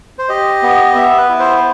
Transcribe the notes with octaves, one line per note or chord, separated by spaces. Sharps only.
C5
G4 D#5
B3
B3 E5
B4
E4
C5
C5